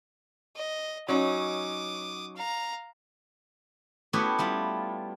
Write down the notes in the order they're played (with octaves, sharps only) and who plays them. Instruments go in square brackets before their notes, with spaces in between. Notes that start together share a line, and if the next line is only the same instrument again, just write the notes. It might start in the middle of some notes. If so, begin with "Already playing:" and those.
[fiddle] D#5
[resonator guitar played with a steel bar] F#3 C#4 D#4 [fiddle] D6 D#6
[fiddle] F5 A#5
[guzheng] A3 B3 E4 F#4 G4 C#5
G3 E4 F4